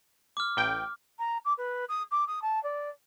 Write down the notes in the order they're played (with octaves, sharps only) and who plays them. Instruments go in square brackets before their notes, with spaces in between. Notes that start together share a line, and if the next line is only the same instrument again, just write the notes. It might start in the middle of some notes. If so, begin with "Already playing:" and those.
[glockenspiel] D6 F6
[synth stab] A1 G5
[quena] A#5
D6
B4
D#6
D6
D#6
A5
D5